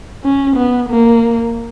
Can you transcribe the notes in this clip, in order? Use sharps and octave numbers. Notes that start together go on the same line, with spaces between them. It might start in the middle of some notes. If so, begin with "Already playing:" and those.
C#4
B3
A#3